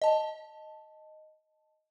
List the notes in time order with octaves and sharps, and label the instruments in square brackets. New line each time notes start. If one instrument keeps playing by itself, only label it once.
[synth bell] D#5 A5